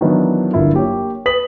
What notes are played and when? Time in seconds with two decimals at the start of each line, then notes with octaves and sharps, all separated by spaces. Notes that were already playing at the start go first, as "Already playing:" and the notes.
0.01 D#3 E3 F#3 B3 D4 E4
0.53 D1 G1 G2 E4 F4 A#4
0.73 A#3 G4 C#5
1.26 B4 D#6 B6 F#7